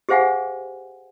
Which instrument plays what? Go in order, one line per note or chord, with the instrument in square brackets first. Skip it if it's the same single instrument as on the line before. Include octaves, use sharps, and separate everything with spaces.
[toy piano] G4 G#4 C5 F5 F#5 G#5